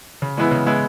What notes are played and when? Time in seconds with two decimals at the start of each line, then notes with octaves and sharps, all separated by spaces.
0.22 C#3
0.37 E3 G#3 B3 E4
0.51 C#3
0.66 E3 G#3 B3 E4